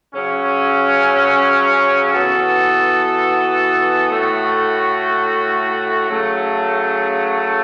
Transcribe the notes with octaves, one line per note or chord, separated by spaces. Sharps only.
C#3 F#3 C#4
E3 B3 F#4 A4
A2 A3 F#4
C#3 F#3 A3